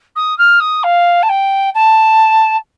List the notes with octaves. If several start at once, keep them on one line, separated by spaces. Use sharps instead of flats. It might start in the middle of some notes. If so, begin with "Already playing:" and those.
D#6
F6
D#6
F5
A5
G5
A5